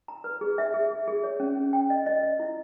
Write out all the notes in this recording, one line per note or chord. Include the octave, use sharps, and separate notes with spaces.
A#5
B4
G#4
E5
G#4
G#4
G#4
C#5
C#4
C#4
G5
D#5
D#5
D#5
E4